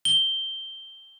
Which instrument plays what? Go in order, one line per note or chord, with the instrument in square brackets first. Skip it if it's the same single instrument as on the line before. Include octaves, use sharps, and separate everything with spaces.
[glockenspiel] G7